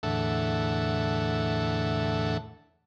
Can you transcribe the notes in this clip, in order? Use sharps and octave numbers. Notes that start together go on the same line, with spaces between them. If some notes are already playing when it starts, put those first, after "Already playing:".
E2 A2 D3 A4 E5 F#5